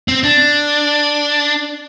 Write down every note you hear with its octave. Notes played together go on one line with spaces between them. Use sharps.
C4
D4